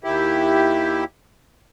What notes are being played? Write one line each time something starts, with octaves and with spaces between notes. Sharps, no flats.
D#2 E4 G4